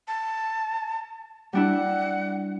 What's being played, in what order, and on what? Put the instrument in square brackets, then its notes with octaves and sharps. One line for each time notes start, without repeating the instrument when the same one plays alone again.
[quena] A5
[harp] G3 D4 E4 [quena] F#5